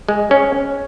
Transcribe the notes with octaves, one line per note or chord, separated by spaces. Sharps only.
G#3
C#4